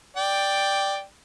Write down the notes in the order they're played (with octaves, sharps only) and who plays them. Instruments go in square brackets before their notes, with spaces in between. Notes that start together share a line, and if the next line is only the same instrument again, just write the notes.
[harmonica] D5 G5